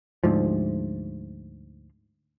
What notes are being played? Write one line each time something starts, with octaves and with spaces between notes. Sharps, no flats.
D2 G#2 F3